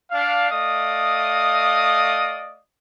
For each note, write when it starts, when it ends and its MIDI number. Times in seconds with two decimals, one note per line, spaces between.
0.11 0.47 62
0.11 0.47 77
0.50 2.59 57
0.50 2.59 74
0.50 2.59 75
0.50 2.59 77
0.50 2.59 87